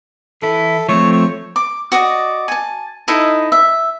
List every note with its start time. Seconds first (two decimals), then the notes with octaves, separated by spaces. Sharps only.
0.42 E3 E4 A4
0.89 F3 A3 C4 C#5
1.13 C#5
1.56 D6
1.92 F#4 D5 D#5
2.48 G#5 A5
3.08 D#4 E4 A4 D#5
3.52 E5